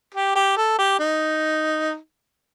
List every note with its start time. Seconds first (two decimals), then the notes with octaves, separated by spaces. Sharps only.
0.14 G4
0.36 G4
0.57 A4
0.78 G4
0.99 D#4